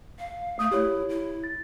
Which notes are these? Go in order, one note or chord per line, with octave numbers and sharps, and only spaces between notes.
F5
A3 D#6
E4 G4 C#5
E4
A6